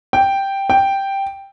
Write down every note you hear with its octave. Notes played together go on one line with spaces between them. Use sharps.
G5
G5